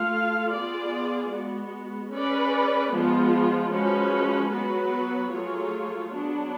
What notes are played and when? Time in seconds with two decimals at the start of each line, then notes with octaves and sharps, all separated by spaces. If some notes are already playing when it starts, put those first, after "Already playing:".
Already playing: A3 F4 A4 F5
0.54 B3 F4 G#4 D5
1.32 G#3 B3 F#4
2.13 C#4 G#4 B4 D5
2.93 F3 G#3 B3 F4
3.72 F3 G#3 C#4 F#4 B4
4.52 F#3 B3 F#4 B4
5.32 F#3 A3 F4 G#4 C#5
6.12 F#3 B3 D4